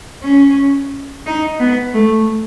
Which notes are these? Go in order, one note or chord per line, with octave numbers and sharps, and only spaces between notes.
C#4
D#4
B3
A3